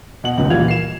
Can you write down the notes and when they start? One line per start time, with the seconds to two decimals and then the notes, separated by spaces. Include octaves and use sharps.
0.24 B2 F#5 F#7
0.38 D#1 C#2
0.50 A#2 E3 G3 F4 G#6 F7
0.68 C7 E7